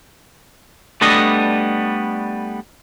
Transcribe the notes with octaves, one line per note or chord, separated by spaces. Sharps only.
G3 A3 B3 D4 D#5